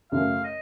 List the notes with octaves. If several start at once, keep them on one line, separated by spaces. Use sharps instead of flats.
F#2 C#3 A3 F5
D#5